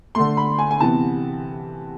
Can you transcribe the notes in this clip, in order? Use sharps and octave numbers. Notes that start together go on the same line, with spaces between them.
D3 A3 C6
B5
G#5
G#5
C3 E3 B3 A5